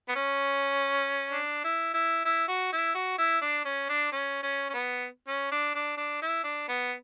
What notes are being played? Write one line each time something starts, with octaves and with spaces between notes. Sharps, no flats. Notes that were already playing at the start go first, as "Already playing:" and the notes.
B3
C#4
D4
E4
E4
E4
F#4
E4
F#4
E4
D4
C#4
D4
C#4
C#4
C#4
B3
C#4
D4
D4
D4
E4
D4
B3